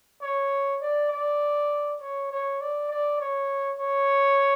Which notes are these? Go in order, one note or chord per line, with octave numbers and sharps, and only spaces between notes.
C#5
D5
D5
C#5
C#5
D5
D5
C#5
C#5